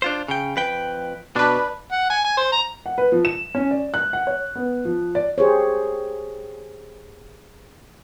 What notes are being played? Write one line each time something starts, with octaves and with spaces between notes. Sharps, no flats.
D4 F4 C5
C#3 G5
F2 B4 G5
B2 D4 B4
F#5
G#5
G#5
C5
A#5
F#5
B4
F3
E7
C#4
D5
F#6
F#5
C#5
B3
F3
D5
G4 G#4 C5 C#5